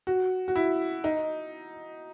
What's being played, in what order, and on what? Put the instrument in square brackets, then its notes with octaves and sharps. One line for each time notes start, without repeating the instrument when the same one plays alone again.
[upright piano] F#4
F#4
E4
D#4